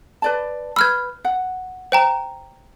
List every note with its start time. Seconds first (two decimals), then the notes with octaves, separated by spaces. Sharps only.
0.22 B4 D5 A5
0.76 B4 B5 E6 F6 G#6
1.25 F#5
1.92 C5 G5 A#5